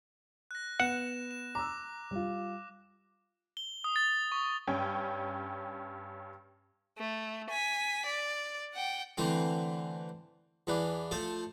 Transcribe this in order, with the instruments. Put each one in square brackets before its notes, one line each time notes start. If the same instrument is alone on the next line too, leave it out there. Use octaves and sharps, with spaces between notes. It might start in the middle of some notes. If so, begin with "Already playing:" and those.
[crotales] F#6 A#6
[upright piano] B3 [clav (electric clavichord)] F#5 [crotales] E7
[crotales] E7
[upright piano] A#5 E6 [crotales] D6
[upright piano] G3 F4
[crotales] G7
D#6
A6
C#6
[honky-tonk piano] G2 C#4 G5
[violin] A3
G#5 B6
D5
F#5 G5
[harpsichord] D3 E3 A3 C4
E2 E3 D4
F3 A3 A4